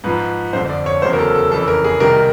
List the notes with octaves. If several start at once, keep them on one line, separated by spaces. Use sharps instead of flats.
G#2 F3 B4
F2 D3 F3 C5
D5
C#5
E2 C#3 F#3 C5
A#4
A4
A4
F2 C#3 E3 A4
A#4
G#4
C2 C3 D#3 A#4